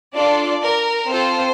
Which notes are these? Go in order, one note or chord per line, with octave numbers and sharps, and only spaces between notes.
D4 F4 A4 D5
A#4
C4 F4 A4 C5